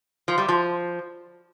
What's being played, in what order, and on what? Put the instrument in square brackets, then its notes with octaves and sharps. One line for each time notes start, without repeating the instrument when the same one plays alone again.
[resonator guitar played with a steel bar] F3
G3
F3